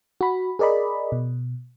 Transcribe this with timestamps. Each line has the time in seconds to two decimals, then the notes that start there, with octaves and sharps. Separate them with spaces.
0.21 F#4 B5
0.59 G#4 A#4 D5 D#5 B5
1.12 B2